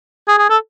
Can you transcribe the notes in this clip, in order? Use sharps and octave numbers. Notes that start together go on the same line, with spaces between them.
G#4
G#4
A4